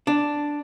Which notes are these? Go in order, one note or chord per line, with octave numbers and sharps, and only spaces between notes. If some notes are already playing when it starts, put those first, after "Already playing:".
D4